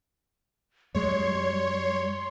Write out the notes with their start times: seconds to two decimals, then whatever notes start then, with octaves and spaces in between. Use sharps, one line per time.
0.95 F#2 G3 G#3 C#5 C6